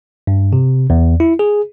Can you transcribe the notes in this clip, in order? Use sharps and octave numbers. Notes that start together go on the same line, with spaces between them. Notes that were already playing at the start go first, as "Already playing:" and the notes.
G2
C3
E2
E4
G#4